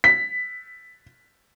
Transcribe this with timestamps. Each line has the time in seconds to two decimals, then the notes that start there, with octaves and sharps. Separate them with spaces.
0.04 B6